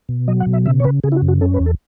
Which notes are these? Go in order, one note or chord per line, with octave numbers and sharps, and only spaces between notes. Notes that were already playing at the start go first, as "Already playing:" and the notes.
B2
F#3 D#5
F#5
B2
E5
C#3 E5
C#5
C#3 B4
C#3 G#4
E4
F#4
F#2
F#4
C#4 A4
B4
E2
A4